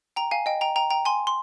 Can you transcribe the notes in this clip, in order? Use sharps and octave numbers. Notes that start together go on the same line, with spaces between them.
G5 A#5
F5 G#5
D#5 G5
G5 A#5
G5 A#5
G5 A#5
G#5 C6
C6